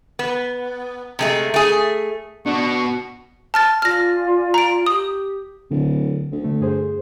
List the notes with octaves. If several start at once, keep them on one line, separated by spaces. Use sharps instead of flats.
B3
C3 G#3 A3
A3 G#4
B2 D4 F#4 C#6
A5 F6 A6
F4 D5 G#5 F6 A#6
A#5 D7
G4 D#6
D1 D3
D2
D3 A3
G2 G#4 C5